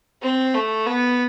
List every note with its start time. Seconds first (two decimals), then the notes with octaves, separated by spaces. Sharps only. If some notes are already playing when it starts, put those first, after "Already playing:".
0.22 C4
0.54 A3
0.86 B3